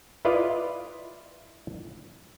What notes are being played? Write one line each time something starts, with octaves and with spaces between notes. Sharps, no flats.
E4 F4 B4 D5 D#5 F5